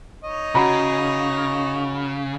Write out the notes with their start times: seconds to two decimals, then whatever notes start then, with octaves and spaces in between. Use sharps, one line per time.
0.24 D#4 C#5 D#5
0.55 C#3 F#4 A#5 B5